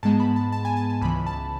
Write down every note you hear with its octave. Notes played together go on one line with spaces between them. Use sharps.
G#2 G#3 B3 A5
B5
A5
A5
G#5
A5
A5
C#2 C#3 E3 B5
A5